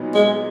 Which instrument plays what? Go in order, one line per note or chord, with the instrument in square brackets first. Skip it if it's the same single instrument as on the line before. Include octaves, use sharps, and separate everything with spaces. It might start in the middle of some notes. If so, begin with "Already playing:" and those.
Already playing: [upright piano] A#2 F#3 B3 D#4
[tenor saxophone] G#3